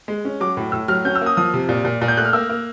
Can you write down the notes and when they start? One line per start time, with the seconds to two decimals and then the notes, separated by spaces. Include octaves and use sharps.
0.08 G#3
0.25 C#4
0.40 F#3 D6
0.57 A2
0.72 A2 E6
0.88 F#3 F6
1.05 C#4 G6
1.15 E6
1.21 A#3 D#6
1.37 F3 D#6
1.54 C3
1.69 A#2
1.85 A#2
2.01 A#2
2.08 G6
2.17 A3 F#6
2.25 F6
2.33 A#3 E6
2.50 A#3